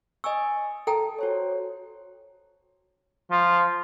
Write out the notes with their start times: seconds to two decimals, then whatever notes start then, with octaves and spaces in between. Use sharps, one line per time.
0.24 D#5 G#5 C#6 E6
0.87 A4 G5 A5 A#5
1.19 F#4 C5 C#5
3.31 F3